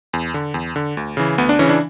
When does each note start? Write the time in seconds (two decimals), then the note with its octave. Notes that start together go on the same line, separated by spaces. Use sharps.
0.13 E2
0.34 D3
0.54 E2
0.76 D3
0.97 D2
1.17 C#3 E3
1.38 D2 B3
1.49 D4
1.59 C#3 E3 C#4
1.69 D4